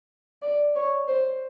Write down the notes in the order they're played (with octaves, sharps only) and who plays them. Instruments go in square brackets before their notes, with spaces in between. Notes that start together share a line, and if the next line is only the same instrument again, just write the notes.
[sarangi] D5
C#5
C5